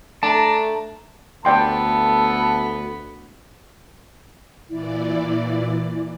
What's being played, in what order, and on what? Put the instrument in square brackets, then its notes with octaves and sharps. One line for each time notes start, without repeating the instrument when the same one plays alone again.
[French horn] A3 [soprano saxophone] D4 [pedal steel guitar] A5 A#5
[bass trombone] D2 [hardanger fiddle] B3 [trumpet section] E4 A4 A5 [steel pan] D5 G5 C6
[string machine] A#2 E3 D5 [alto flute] E4